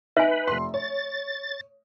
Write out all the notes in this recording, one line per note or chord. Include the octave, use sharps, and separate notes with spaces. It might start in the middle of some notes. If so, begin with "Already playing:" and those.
D#4 B4 E5 G#5
F1 C6
C#5 A6